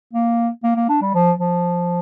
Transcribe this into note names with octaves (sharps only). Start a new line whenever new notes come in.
A#3
A#3
A#3
D4
G3
F3
F3